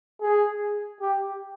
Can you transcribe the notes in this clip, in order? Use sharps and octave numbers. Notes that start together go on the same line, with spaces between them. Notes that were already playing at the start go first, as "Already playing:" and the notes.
G#4
G4